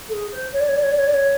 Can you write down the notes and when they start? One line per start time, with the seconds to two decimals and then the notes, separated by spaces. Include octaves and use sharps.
0.09 A4
0.13 G#4
0.32 C5
0.53 C#5
0.60 D5
0.68 C#5
0.76 D5
0.83 C#5
0.92 D5
0.98 C#5
1.07 D5
1.14 C#5